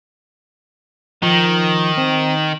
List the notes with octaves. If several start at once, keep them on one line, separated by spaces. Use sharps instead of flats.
D#3 F3
C4